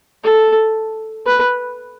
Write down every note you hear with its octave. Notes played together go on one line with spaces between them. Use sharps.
A4
B4